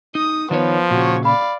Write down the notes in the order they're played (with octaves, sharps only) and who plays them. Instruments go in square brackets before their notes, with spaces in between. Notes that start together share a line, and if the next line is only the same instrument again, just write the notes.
[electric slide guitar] D#4 [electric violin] D#6
[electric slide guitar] D#3 D#4 C#5 [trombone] F3 [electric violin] B3 B4
[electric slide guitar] A#2 C#3 [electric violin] F#4 C#5
[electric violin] D5 F5 [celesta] B5